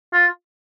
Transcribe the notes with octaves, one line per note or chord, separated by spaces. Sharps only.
F4